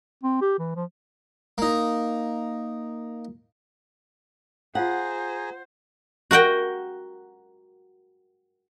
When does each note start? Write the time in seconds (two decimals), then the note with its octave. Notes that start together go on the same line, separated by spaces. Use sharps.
0.23 C4
0.42 G4
0.59 E3
0.76 F3
1.58 A#3 D#4
4.75 F4 G#4 C5 F5 F#5 G#5 A#5
6.31 F#4 A#4 F#5 G5